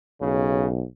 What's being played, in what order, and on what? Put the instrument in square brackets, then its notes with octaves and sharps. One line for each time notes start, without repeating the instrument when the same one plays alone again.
[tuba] B1 [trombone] C#3